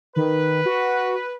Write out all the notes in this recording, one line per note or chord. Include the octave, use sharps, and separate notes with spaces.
D#3 B4
F#4